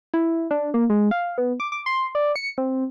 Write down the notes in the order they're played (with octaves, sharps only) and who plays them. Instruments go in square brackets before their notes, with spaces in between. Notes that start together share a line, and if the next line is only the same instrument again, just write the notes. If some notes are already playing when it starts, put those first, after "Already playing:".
[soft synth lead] E4
D4
A#3
G#3
F5
B3
D6
D6
C6
D5
C#7
C4